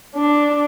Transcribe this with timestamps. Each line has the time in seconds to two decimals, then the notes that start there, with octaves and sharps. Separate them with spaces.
0.16 D4